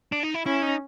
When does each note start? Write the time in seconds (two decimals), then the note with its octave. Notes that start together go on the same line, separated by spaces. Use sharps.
0.12 D4
0.23 D#4
0.34 E4
0.46 C#4 E4
0.62 D#4